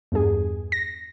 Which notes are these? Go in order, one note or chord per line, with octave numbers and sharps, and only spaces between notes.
E2 G2 G#4
A#6